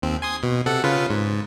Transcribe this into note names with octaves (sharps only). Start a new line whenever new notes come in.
D#2 C4
G#5 C6 D#6
B2
C3 A4 F#5
C#3 F4 B4
G#2